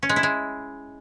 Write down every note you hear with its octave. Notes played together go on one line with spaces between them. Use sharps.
C#4
G#3
E4
G#3